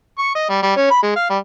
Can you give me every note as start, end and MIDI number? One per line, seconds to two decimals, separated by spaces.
0.18 0.34 85
0.35 0.47 75
0.49 0.62 55
0.63 0.72 55
0.77 0.87 61
0.91 1.02 83
1.03 1.14 56
1.16 1.27 77
1.30 1.38 55